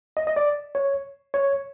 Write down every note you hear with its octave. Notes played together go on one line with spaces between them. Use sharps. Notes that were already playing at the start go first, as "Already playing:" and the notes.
D#5
D#5
D5
C#5
C#5